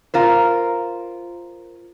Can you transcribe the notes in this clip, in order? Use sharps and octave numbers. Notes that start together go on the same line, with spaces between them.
F4 A#4 C5